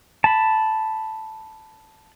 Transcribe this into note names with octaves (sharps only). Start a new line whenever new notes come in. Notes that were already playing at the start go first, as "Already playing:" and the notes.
A5 B5